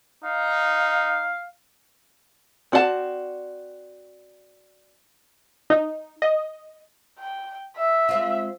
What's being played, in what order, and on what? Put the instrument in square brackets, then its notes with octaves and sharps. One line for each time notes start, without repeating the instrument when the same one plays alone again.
[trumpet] D#4 [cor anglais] F5
[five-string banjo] C4 F#4 D5 F5 A5
[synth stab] D#4
D#5
[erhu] G5
E5
[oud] G#3 C4 F4